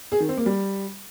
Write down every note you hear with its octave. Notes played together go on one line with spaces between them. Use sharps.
G#4
D#3
C4
A#3
G3